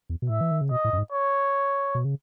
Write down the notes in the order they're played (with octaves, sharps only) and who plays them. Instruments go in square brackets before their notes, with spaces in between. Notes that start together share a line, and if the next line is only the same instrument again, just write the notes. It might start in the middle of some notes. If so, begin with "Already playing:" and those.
[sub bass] E2
B2
[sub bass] A2 [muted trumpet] E5
[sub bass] E3
D#3
C#3
[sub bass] B2 [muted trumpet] D#5
[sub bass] A2
F#2
G#2
[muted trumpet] C#5
[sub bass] B2
C#3